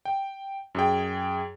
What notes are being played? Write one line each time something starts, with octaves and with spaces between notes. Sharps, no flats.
G5
F#2 G#4 G5